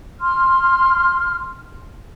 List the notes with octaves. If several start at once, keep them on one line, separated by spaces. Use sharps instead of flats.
C6 F6